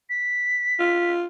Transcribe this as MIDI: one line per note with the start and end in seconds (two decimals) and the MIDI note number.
0.09 1.11 95
0.79 1.25 65